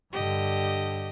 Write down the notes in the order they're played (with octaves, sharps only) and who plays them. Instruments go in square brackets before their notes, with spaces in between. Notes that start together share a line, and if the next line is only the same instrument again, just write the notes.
[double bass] G2 D3 [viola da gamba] G4 D#5